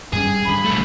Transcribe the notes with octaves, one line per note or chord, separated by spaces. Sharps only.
G2 G3 C#4 G#4
G#1 G2 D3 B5
B1 A3